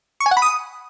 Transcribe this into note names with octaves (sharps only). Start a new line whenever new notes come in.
C#6
G#5
F#5
B5
D#6